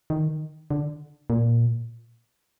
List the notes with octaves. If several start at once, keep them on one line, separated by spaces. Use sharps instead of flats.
D#3
D3
A#2